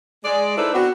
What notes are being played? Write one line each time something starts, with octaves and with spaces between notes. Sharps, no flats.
G#3 D5
D#4 E4 A4 B4 C5 D5
B3 C4 D4 F#4